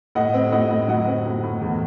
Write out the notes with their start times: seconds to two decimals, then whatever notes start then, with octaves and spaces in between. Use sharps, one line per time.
0.15 A2 D#5 F#5
0.34 C4
0.52 A2 D#5 F#5
0.70 A2
0.88 F#3 D#5 F#5
1.07 C4
1.26 A2
1.43 A2
1.62 E2